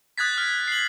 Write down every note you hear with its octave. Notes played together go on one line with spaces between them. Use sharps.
D#6 F#6 G#6 A6 B6
F6
C7 F#7